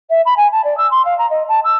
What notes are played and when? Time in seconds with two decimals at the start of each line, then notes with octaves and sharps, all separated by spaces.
0.10 E5
0.25 B5
0.37 G#5
0.52 A5
0.64 D5
0.77 E6
0.91 C6
1.04 F5
1.18 A#5
1.30 D#5
1.48 A5
1.64 E6